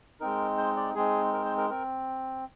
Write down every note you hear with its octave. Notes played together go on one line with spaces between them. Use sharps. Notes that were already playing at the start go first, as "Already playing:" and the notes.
G#3 C4 D#4 A#4
C5
D5
G#3 C4 D#4 G#4
A#4
C5
A#4
C4 A#4